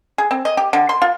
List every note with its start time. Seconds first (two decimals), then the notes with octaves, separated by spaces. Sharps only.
0.18 G#4
0.31 C4
0.45 D#5
0.57 G4
0.73 D3
0.89 C6
1.02 F4